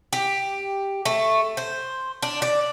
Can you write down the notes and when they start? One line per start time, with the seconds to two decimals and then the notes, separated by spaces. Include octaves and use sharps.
0.13 G4
1.05 A3
1.57 C5
2.22 D4
2.42 D5